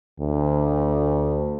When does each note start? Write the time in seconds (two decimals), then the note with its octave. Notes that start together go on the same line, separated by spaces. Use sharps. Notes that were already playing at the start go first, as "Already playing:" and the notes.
0.19 D2